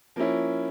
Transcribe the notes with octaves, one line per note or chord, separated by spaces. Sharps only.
F3 A#3 C#4 E4